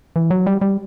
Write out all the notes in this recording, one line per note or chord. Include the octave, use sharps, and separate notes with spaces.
E3
F#3
G3
G3